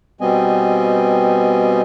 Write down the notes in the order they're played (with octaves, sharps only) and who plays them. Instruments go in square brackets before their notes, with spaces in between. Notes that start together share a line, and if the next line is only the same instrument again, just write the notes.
[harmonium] B2 G3 B3 C4 D#5 G#5